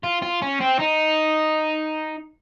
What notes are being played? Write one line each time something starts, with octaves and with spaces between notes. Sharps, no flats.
F4
F4
C#4
C4
D#4